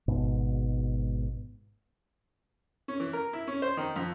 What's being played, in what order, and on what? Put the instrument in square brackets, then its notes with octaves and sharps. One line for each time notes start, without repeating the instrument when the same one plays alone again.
[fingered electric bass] G#1 G#2 B2
[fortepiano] C#4
E3
A#4
E4
C#4
C5
D#3
F2